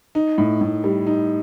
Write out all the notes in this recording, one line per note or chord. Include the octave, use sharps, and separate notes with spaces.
D#4
A2
A2
G3
D#4